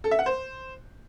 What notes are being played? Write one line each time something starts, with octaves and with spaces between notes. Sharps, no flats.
A4
E5
F#5
C5